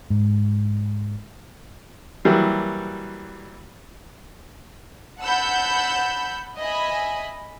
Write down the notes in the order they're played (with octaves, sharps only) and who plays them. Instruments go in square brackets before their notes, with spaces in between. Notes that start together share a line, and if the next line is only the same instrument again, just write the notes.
[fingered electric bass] G#2
[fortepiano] E3 F#3 G3 A#3
[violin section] F#5 A5 B5 E6 G6
D#5 E5 G#5 B5